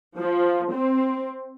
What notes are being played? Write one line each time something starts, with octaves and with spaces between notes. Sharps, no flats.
F3
C4